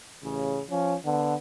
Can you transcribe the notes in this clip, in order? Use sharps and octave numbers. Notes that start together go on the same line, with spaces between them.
A1 C#3
F3 C#4
D3 B3